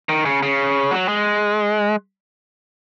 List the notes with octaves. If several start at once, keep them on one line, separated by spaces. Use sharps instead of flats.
D#3
C#3
C#3
F#3
G#3